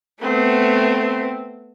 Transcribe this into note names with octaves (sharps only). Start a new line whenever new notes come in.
A3 B3 C4